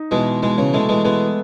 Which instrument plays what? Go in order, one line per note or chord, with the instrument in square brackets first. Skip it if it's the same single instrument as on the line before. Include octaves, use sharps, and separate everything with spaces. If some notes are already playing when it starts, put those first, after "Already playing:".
Already playing: [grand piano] D#4
[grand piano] B2 [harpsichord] E3 G#3
[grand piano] B2 [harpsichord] E3 G#3
[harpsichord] C#3 E3
[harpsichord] E3 G#3 [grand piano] A3
[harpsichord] E3 G#3
[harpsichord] E3 G#3 [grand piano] B3